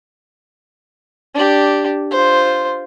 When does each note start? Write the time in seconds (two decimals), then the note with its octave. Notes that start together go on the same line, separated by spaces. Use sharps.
1.34 D4 G4
2.11 F4 C5